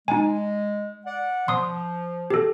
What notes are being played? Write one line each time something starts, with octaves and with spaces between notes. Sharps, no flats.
G#3 D#4 G#5
D5 F#5
F3 C6 D#6
G4 A4